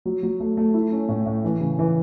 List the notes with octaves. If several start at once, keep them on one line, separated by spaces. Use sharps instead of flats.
F#3
F#3
A3
A3
E4
C#4
A2
A2
E3
C#3
E3